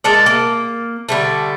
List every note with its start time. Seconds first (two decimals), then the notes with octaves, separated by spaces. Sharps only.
0.04 G#3 A#3 A4 D5
0.26 A#3
1.09 D3 G3 A3